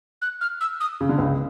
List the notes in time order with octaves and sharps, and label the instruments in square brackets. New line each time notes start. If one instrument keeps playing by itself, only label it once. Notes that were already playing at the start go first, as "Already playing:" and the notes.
[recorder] F#6
F6
E6
D#6
[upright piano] C#3
D3
C#2 C#3